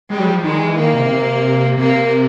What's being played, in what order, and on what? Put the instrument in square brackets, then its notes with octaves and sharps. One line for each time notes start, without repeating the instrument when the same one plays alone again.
[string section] G3 [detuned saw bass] G#3
[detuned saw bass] F#3
F3
[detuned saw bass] D#3 [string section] G#3
[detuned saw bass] E3
[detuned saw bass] D#3 [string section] A#3
[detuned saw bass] C3
C3
[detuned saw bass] C3 [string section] A#3